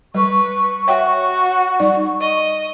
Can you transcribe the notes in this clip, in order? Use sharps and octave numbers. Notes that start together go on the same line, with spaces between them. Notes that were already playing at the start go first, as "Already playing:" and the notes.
G3 B4 C#6
F#4 C#5 E5 G5
G3 D#4 D5
D#5